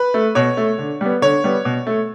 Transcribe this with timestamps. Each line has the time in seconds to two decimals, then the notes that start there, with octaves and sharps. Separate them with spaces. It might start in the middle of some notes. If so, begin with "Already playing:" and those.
Already playing: B4
0.14 A3
0.35 B2 C#5
0.57 A3
0.78 D3
1.01 G3 B3
1.22 D3 C#5
1.44 G3 B3
1.65 B2
1.87 A3